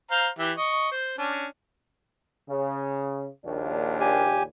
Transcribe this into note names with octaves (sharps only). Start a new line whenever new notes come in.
C5 F5 A#5
E3 G4 E5
D#5 C#6
C5
C#4 D4
C#3
A#1 D#2 D4
G4 G#5